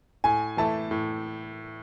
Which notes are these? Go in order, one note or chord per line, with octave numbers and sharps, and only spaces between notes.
A2 G#5
E3 A3 E4 A5
A2